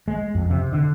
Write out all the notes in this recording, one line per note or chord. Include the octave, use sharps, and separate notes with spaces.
G#3
F2
C3
D3